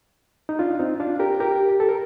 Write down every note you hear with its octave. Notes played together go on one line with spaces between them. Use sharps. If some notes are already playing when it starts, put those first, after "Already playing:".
D#4
D4 F4
C4 D#4
D4 F4
G4 A#4
G4 A#4
A4
A#4